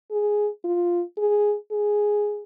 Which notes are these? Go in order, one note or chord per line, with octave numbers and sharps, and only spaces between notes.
G#4
F4
G#4
G#4